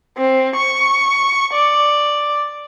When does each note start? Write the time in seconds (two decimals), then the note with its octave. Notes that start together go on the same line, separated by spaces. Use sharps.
0.18 C4
0.55 C#6
1.54 D5